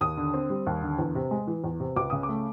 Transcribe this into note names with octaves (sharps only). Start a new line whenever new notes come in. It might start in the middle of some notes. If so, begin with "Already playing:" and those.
D#2 D#6
D3
C4
G3
D#2
D3
E2
C3
G#3
E3
E2
C3
C#2 D6
C#3 D#6
D6
A3